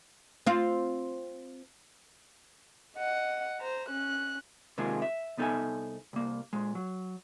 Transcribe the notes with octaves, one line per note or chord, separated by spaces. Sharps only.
C4 F4
D#5 F#5
C5 A#5
C#4 F#6
C3 D#3 G#3 A#3 F4 G#4
E5
C2 B3 D#4 A4 E5 G#5
C2 A#3
A#2 G#3
F#3